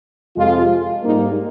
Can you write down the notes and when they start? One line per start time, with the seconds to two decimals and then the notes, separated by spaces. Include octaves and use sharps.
0.37 F2 C3 F3 G#3 F4
1.03 G#2 G3 A#3 D#4